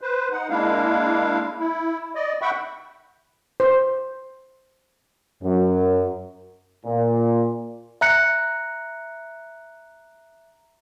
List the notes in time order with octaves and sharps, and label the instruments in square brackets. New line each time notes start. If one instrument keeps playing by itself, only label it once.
[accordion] B4 C5
D#4 F#5
G#3 A#3 D4 E4 F5
E4
D5 D#5
E5 F#5 G5 B5 C#6
[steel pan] C5
[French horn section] F#2
[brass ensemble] A#2
[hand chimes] E5 A#5 F#6 C#7